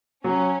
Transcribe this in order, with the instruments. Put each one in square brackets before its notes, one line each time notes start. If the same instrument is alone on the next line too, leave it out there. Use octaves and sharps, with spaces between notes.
[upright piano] F#3 [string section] C#4